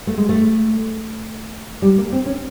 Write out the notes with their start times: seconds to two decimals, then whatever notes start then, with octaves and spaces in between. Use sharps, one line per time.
0.07 A3
0.17 G#3
0.29 A3
1.82 G3
1.98 A#3
2.12 C4
2.26 C#4